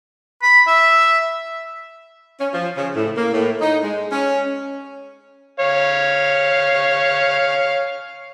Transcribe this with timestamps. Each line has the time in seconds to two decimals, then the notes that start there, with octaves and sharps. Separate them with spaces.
0.43 B5
0.68 E5
2.40 C#4
2.53 F3
2.77 C#3
2.95 A2
3.17 A#3
3.33 A2
3.61 D#4
3.83 G#3
4.11 C#4
5.60 C#5 F5